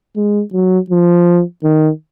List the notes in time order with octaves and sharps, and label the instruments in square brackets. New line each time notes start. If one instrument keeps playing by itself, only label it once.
[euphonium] G#3
F#3
F3
D#3